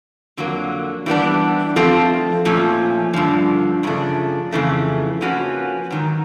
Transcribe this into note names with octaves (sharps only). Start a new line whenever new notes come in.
F2 D3 F#3 A#3
E3 G3 B3 D4
F3 A3 C4 F4 A4
A#2 F3 A3 C#4
G2 D3 F3
F#2 C#3 F3 A3 D4
F2 C#3 E3 A3
F3 A#3 C#4 F#4 B4
G#2 D#3 F#3